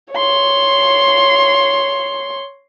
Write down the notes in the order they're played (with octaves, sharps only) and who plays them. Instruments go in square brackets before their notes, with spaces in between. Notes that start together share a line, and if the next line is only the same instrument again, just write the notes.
[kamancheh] C#5 C6